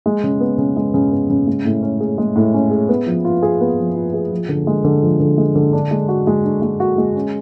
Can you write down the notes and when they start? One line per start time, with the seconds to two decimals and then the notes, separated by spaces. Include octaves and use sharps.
0.06 G#3
0.24 C#3
0.40 B3
0.58 C#3
0.77 G#3
0.94 C#3
1.12 B3
1.30 C#3
1.47 G#3
1.65 A2
1.82 C#4
2.00 G#4
2.18 G#3
2.36 A2
2.54 C#4
2.71 G#4
2.89 B3
3.06 F3
3.25 F4
3.43 G#4
3.61 B3
3.78 F3
3.96 F4
4.14 G#4
4.32 F3
4.49 D3
4.67 G#3
4.85 D3
5.02 F3
5.20 D3
5.38 G#3
5.55 D3
5.73 D4
5.91 G#3
6.08 F#4
6.27 G#3
6.44 D4
6.62 G#3
6.80 F#4
6.98 G#3
7.16 C#4